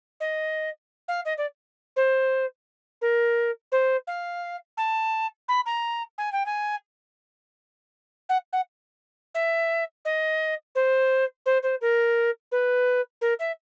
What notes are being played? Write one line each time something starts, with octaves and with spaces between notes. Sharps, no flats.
D#5
F5
D#5
D5
C5
A#4
C5
F5
A5
B5
A#5
G#5
G5
G#5
F#5
F#5
E5
D#5
C5
C5
C5
A#4
B4
A#4
E5